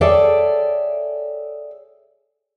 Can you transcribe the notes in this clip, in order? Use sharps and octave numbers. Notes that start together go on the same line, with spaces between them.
G#4 A4 C#5 D5 E5 G5